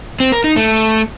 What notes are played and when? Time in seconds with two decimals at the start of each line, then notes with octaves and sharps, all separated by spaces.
0.20 C4
0.32 A#4
0.44 D#4
0.56 A3